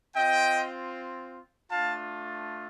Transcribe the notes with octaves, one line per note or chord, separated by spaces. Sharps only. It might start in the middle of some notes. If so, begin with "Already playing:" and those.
C4 F4 D#5 G5
A3 D4 F4 F5 A5